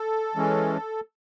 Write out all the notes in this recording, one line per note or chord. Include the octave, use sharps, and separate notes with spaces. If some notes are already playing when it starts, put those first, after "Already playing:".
Already playing: A4
E3 G#3 C#4